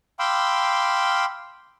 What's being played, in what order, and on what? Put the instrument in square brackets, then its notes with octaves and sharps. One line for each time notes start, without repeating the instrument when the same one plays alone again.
[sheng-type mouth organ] F5 G5 B5 C6 D6 E6